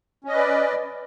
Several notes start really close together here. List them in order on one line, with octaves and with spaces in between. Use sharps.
C#4 D#5 B4 D5